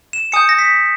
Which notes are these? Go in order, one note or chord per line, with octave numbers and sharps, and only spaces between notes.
E7
G#5 D#6 G6 C#7
A#6
B6